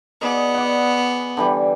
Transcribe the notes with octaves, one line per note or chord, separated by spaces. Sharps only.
B3 G#4 D5 D#5
D5 F#5
D3 E3 G3